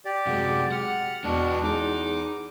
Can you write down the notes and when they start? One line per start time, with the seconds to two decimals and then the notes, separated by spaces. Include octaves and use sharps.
0.05 G4 D5
0.27 F#2 C3 G#3 F#4
0.72 F#5 F6
1.24 E2 B2 G#3 D4 F#4
1.63 E2 D#4 G#4 D6